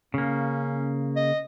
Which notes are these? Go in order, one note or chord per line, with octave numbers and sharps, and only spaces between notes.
C#3 A#3 C#4
D#5